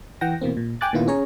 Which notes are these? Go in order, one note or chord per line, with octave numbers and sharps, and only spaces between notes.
E3 F#5 G5 A#6
B2 E3 A#3 C4
A#2
G5 G#5 D6 F#6 A6
A#2 D#3 B3 E4 F4
C#4 G#4 C#5 A#5